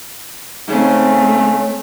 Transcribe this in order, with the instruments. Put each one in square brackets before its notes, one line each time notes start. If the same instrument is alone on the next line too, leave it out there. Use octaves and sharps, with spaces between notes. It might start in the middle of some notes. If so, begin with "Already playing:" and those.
[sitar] G#2 C#3 [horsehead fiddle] A3 C4